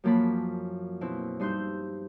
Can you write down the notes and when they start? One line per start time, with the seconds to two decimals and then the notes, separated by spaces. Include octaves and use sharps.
0.04 F#2 F3 A#3 A5 B5
1.01 B2 C4 E4
1.40 G2 D#4 C6 E6 G6